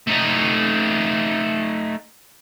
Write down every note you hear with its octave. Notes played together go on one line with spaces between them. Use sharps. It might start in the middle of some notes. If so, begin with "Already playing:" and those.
A3 D#4